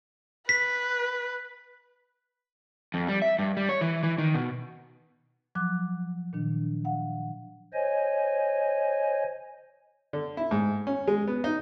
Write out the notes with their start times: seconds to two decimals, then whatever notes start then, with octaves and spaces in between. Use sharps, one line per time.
0.49 B4 B6
2.94 F2
3.08 G3
3.22 E5
3.39 G2
3.57 G3
3.69 C#5
3.81 E3
4.03 E3
4.18 D#3
4.35 B2
5.55 F3 F#3 D6 F#6
6.33 A#2 D#3 D4
6.85 F5 F#5
7.74 C5 C#5 D#5 G#5
10.13 D3
10.37 E4
10.51 G#2
10.87 C#4
11.08 G#3
11.28 B3
11.44 D#4